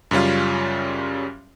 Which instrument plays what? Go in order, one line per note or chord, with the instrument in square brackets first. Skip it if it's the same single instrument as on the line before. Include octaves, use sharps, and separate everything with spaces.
[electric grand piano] F#2 C#3 G3 C#4 F4